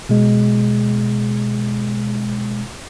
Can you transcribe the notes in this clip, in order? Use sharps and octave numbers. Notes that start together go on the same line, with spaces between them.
B2 G#3